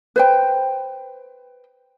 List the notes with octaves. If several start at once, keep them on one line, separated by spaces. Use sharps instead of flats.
B4 C5 G5